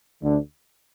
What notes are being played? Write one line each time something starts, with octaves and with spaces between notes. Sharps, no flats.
D2 D3